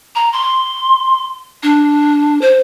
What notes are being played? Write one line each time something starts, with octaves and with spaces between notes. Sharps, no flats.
A#5
C6
D4
C5